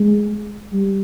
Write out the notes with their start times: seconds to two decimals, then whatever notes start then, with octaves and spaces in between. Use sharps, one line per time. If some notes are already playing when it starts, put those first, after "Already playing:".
Already playing: G#3
0.73 G3